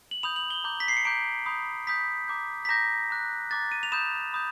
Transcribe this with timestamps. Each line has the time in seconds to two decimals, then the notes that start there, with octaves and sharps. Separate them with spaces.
0.11 F#7
0.23 B5 D#6 G6 F7
0.36 F#7
0.50 G7
0.64 A#5 D6 G6
0.80 B6
0.88 C7
0.97 C#7
1.05 A#5 D6 G6 D7
1.46 B5 D#6 G6
1.87 B5 D#6 G6 B6
2.28 A#5 D6 G6
2.65 B6
2.69 A#5 D6 G6 A#6
3.10 A#5 D6 F#6
3.51 A#5 D6 F#6 A6
3.72 D#7
3.83 F7
3.92 B5 D#6 G6 E7
4.33 B5 D#6 G6